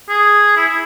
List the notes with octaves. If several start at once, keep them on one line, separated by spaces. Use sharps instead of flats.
G#4
E4
E4